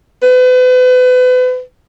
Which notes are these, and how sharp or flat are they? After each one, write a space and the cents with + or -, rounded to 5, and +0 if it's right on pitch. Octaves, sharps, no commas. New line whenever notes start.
B4 +35